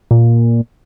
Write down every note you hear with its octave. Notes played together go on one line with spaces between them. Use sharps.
A#2